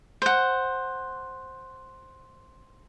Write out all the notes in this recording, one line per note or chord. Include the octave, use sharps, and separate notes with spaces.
C5 F#5